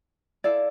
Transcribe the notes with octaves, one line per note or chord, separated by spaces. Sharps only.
E4 A4 D5 F5